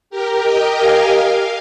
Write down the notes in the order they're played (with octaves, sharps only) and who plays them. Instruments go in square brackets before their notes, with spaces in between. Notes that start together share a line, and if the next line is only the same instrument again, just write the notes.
[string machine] G4 A#4
D#5 G5
F5 G#5
F5 G#5